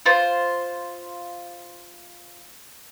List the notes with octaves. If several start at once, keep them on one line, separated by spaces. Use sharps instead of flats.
F4 C5